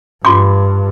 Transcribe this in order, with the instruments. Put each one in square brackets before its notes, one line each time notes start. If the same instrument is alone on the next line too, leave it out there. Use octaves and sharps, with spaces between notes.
[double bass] G2 [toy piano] F4 C6 D6